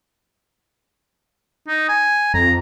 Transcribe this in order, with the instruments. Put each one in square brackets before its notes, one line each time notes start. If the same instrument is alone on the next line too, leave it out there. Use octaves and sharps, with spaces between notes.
[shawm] D#4
G#5
[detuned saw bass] F2 [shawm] A#5